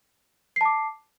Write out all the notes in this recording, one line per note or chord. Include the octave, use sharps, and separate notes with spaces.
A5 D6 C7